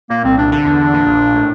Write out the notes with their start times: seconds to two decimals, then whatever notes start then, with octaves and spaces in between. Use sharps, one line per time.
0.10 A#2 A#3
0.24 C2 C4
0.37 C2 D4
0.52 D3 D4
0.65 E2
0.79 E2
0.94 A#2
1.06 A#1
1.21 A#1
1.35 A2